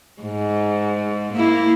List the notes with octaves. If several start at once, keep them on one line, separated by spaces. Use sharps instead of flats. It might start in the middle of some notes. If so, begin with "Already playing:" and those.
G#2
A#3 E4